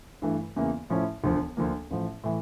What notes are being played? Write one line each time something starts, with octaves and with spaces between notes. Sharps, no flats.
G2 E3 A3 E4
E2 C#3 E3 A#3
A2 F3 C#4 E4
E1 D2 D3 F3
D2 D3 F3 A#3
A1 A2 F3
A2 E3